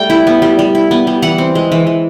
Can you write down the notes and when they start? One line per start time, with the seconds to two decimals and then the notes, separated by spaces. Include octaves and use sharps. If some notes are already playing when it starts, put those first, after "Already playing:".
Already playing: G3 A3 G5
0.10 E4
0.27 B3
0.42 G3
0.59 G3
0.75 E4
0.91 B3
1.07 G3
1.22 E3 F#5
1.38 C4
1.55 G#3
1.72 E3
1.87 E3